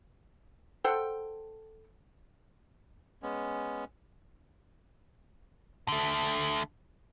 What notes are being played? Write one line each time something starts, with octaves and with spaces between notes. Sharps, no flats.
A4 C5 F#5 G5
G#3 B3 C#4
D3 A3